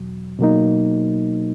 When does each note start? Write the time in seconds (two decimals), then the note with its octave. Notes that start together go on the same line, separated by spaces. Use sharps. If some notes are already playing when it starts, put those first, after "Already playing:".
Already playing: E2 B2 F#3
0.39 B2 F#3 A#3 D#4